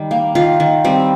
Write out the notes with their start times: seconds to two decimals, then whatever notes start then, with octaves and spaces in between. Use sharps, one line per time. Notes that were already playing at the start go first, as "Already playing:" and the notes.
Already playing: D#3 G3
0.11 A#3
0.35 D#3 F4
0.60 D#3
0.85 G3 C4